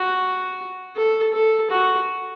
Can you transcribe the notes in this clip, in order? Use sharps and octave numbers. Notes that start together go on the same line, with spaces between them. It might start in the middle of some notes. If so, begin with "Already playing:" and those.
Already playing: F#4
A4
A4
F#4